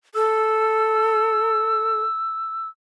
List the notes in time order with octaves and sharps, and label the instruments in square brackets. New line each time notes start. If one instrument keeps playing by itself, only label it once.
[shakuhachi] A4 [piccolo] E6